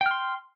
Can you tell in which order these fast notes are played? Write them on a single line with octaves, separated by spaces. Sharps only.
G5 F6 C6